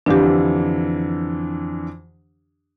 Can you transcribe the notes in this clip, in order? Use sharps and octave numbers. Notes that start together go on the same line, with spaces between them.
F2 D3 E3 D4 G4